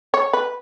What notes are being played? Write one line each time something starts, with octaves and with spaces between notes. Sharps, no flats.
C#5
B4